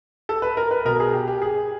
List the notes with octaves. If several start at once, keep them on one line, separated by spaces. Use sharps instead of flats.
A4
B4
A#4
B4
B2 A#4
G#4
G4
G4
G#4